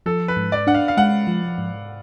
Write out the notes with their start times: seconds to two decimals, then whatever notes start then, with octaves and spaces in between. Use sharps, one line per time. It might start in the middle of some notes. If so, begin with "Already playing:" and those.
0.06 F3 A4
0.28 B4
0.37 G#2
0.52 D5
0.67 D4 F#5
0.74 F5
0.88 F5
0.97 G#3 F#5
1.27 F3
1.58 G#2